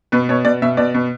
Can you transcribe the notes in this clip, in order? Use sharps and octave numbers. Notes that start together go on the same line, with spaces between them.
B2 B4
B2 C#5
B2 D5
B2 E5
B2 D5
B2